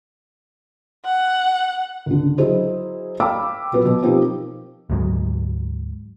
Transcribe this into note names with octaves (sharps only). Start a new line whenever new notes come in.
F#5
C#2 D3
F#3 E4 G#4 C5 D#5
F5 G5 B5 D6 E6
A#2 F#3 B3
B2
F3 C4 D#4 G4 A#4
D2 G#2 F#3 G#3